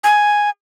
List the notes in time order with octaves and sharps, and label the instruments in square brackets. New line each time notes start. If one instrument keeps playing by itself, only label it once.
[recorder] G#5